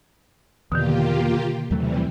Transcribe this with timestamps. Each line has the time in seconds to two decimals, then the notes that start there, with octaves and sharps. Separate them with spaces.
0.72 E2 B2 D3 D#3 A#3 F4 G4
1.71 D#2 C3 E3 F#3 G3 A3